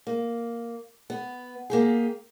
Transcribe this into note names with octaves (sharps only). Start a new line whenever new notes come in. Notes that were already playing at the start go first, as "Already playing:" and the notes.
A#3
B3
A#3 G4 G#4